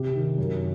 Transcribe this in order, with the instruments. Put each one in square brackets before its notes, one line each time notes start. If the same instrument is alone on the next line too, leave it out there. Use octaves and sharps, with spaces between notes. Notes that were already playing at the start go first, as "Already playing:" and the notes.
Already playing: [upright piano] C3 G4
D#3
F#2